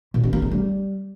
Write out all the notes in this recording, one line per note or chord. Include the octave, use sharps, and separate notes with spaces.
A#2
B3
A#3
A3
G3